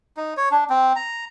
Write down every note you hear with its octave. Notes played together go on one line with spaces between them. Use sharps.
D#4
C#5
D4
C4
A#5